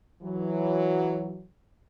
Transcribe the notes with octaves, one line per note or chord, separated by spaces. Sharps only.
E3 F#3